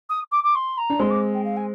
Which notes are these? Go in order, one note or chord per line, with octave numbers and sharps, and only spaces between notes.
D#6
D6
D6
C6
A#5
D4
G#3 C4 C6
D6
G5
F5
G#5